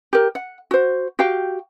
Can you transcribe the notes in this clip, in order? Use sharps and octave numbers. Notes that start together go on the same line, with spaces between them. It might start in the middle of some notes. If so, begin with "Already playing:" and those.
G4 A#4
F#5
F#4 C5
F#4 G4 F5 G5